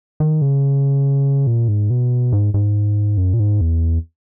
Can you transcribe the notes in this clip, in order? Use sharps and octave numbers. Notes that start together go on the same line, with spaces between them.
D#3
C#3
A#2
G#2
B2
G#2
G#2
F#2
A#2
G#2
E2